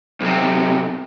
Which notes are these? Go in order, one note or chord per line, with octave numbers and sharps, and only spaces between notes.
B1 C3